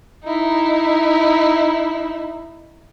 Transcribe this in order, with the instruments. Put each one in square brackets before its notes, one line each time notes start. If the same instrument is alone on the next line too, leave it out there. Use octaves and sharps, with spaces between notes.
[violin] D#4 E4